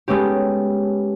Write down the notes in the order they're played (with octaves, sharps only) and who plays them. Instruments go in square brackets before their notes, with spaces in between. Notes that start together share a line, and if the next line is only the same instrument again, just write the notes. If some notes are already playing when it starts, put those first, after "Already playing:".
[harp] G#3 A3 B3 C#4 G4